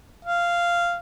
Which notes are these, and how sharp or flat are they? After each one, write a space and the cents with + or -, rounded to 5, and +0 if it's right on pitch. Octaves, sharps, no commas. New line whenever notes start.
F5 -10